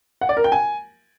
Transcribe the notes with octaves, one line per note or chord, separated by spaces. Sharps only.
F#5
D5
A#4
G5
G#5